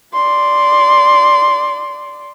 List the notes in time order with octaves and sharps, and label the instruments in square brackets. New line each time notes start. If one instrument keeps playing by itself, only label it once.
[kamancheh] D5 C6